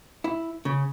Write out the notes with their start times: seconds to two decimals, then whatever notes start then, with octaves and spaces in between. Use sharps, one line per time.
0.24 E4
0.65 C#3